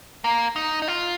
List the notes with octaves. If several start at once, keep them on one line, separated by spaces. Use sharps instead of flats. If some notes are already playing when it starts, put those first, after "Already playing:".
A#3
D#4
D#4
F4